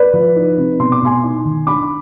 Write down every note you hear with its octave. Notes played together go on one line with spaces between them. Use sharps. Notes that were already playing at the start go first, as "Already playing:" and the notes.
Already playing: B4 D5
F3
D#4
C3
B2 C6
D6
B2 G#5 C6
D#4
D#3
D4 B5 D6